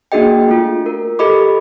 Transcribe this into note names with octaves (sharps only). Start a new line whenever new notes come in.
A#3 D4 F#4 G#4 D#5 G5
A3 F4
A#4
G4 A4 D#5 B5 D6